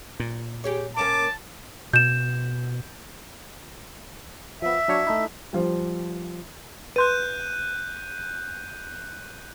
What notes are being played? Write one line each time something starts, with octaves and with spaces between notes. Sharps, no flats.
A#2
G4 G#4 C#5
A#3 C#4 A#4 A5 D6
B2 G6 E7
F3 B3 E5
F#3 D4 C#5
A3 D#4 E4
F3 G3
B4 C6 F#6 G6 D#7